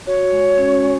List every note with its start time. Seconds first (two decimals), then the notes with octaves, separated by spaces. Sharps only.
0.07 F#4 C#5
0.32 G#3
0.58 C#4
0.83 G#3